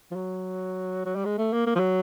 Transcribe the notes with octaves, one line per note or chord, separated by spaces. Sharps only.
F3
F#3
F#3
G3
G#3
A3
A#3
A#3
F3
F#3